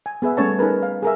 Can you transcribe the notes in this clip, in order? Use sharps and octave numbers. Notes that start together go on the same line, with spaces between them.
G#5
B3 G#4 B4 E5
G3 A3 C#4 C#5 A5
D#4 G#4 A#4 B4
F5
G#4 A#4 E5